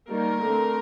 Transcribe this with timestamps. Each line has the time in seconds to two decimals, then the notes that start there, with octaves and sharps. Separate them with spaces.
0.09 D#3 G3 A#3 A#4
0.41 D3 A3 C4